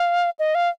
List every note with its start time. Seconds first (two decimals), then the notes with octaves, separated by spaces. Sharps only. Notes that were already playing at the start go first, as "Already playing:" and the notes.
Already playing: F5
0.39 D#5
0.55 F5